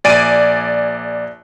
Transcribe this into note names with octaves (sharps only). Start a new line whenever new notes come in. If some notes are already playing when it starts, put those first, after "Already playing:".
A#1 D5 G#5 A6 D7 D#7